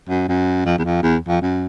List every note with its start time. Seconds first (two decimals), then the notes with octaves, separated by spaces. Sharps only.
0.09 F#2
0.28 F#2
0.66 F2
0.78 E2
0.84 F2
1.03 E2
1.28 F2
1.41 F#2